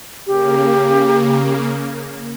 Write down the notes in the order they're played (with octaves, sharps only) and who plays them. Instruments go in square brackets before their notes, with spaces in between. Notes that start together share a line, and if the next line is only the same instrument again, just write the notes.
[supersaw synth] C#3 A#3 [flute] G4